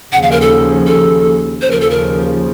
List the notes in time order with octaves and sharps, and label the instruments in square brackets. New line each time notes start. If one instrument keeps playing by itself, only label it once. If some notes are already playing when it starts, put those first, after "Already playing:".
[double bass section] D#2 C#3 F3 [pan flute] F#5
[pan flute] F5
A#4
A4
A4
[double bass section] D#2 C#3 F3 [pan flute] C5
[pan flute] A#4
A4
A#4